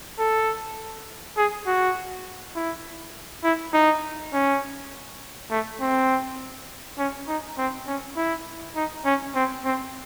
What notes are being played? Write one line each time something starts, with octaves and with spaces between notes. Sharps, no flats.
A4
G#4
F#4
E4
E4
D#4
C#4
A3
C4
C#4
D#4
C4
C#4
E4
D#4
C#4
C4
C4